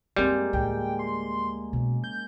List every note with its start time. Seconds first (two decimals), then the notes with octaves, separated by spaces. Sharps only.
0.16 F#2 G3 G#3 A#3 C4
0.53 D2 A2 G5
0.99 C6
1.73 B2 C#4
2.04 G6